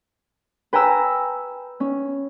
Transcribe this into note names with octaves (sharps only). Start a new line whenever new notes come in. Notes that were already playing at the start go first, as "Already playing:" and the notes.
B4 G5 G#5 A#5 E6 F6
C#4